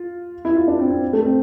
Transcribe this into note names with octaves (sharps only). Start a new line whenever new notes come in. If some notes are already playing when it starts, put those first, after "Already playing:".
Already playing: F4
E4
F4
D4
C4
C4
A3
C4